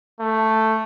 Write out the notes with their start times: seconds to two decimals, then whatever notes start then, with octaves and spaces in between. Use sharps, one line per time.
0.20 A3